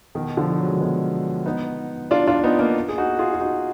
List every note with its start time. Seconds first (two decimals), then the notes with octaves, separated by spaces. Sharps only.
0.15 B2 D#3
0.37 D3 F3
0.59 F#3
0.66 G#3
0.73 D#3 F#3
0.80 G#3 B3
1.46 B3 D#4
2.11 D4 F4
2.27 D4 F4
2.44 B3 D#4
2.59 A#3 D4
2.89 G#4
2.98 D#4 F#4
3.19 F4 G#4
3.34 F4
3.41 D#4 F#4